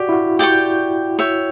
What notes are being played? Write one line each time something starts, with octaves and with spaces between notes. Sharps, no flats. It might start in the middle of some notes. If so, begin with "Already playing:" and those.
Already playing: F#4 G4 D5
E4
F#4
G4 D5 G5 C#6
C#5 E5 G5